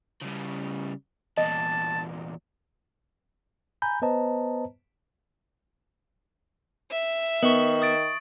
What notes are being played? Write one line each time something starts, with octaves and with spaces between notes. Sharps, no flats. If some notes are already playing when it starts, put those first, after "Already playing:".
C#3 G3
E2 A#2 D#5 A5
G#5 A#5 B5 G6
B3 B4 C5 D#5 A5 A#5
E5
D#3 B3 C#6 F#7
D#6 A6 D7